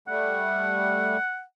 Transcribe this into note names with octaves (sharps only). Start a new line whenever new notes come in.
G3 A3 F#5